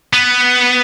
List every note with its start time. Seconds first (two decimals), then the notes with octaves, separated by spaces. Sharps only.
0.13 B3